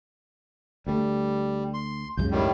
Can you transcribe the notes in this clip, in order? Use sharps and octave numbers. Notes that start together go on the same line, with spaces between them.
D2 G3 A3
C6
C#2 F#2 C#3 G6
A2 D#3 G3